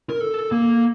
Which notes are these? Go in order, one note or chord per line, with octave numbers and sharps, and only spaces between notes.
A#4
A4
A#3